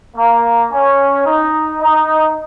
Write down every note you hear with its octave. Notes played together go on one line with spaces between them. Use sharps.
A#3
C#4
D#4
D#4